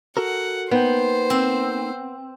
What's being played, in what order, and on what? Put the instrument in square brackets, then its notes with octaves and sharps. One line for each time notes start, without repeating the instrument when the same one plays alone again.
[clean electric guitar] F#4 A4 A#4 [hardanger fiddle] F#5
[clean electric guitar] A#3 D#4 G5 [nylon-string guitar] B3 [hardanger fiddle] C5
[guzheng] C4